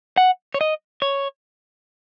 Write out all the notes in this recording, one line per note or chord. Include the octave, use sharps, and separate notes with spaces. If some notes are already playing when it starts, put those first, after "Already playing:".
F#5
C#5
D#5
C#5